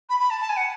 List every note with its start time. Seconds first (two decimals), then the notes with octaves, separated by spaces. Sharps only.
0.09 B5
0.19 B5
0.30 A5
0.41 A5
0.49 G#5
0.56 F#5